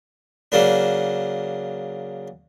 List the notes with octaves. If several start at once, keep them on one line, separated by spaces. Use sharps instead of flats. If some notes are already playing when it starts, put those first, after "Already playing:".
C#3 F#3 A#3 D4